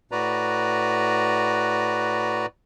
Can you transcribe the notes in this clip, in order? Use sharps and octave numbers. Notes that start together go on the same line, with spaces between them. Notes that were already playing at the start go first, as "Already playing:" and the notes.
A2 F#4 B4 D5 A#5